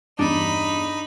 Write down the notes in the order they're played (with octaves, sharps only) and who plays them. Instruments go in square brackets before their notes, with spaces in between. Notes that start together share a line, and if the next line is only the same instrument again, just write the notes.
[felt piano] E2 G2 [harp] D4 [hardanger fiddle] D#4 B5